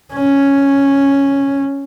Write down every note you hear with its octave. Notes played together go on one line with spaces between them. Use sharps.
C#4